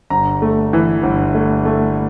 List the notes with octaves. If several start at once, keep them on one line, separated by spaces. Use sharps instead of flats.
G1 A#5
A3
E3
G1
A3
A3